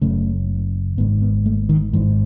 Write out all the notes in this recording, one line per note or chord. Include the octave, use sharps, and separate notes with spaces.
F#1 F#2 C#3 A3
G#1 G#2 B3
B3
A3
D#3
G#1 G#2 E3